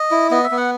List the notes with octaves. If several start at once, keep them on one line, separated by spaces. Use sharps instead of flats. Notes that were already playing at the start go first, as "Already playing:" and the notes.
Already playing: D#5
E4
B3 D#5
E5
B3
F#5